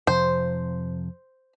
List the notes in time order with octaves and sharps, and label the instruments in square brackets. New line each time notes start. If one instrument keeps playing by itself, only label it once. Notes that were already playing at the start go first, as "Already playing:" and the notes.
[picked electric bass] F2 C3 F3 [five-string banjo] C5